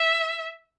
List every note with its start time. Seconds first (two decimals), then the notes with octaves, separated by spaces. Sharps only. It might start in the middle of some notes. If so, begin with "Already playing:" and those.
Already playing: E5